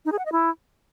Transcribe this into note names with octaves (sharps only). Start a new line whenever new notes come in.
D#4
G#4
F#5
D#5
E4